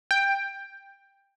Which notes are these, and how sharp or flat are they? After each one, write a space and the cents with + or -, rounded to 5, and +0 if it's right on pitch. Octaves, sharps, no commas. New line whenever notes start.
G5 +10